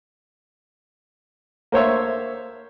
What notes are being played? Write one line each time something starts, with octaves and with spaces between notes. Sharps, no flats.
A#3 C5 C#5 E5